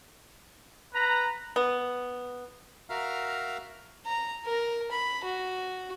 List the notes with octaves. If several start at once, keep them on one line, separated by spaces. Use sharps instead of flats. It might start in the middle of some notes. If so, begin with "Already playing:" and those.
B4 A#5
B3
F#4 A#4 E5 F5 A#5 F6
A#5
A#4
B5
F#4